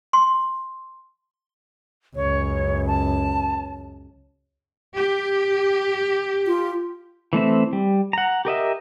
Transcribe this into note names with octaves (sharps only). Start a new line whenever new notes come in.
C6
C#2 F#2 C#5
A5
G4
F4
E3 A3 C4 E5
G3
F#5 A#5
G4 A#4 D#5 E5